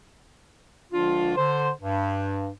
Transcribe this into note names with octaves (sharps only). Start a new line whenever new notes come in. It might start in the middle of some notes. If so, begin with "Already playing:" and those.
C#2 D3 F3 D4 F4
D3 C5
G2